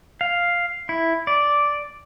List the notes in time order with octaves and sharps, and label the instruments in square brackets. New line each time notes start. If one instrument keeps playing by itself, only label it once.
[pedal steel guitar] F5
E4
D5